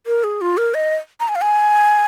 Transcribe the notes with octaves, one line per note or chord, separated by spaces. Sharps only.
A#4
G#4
F4
A#4
D#5
A#5
G#5
F5
G#5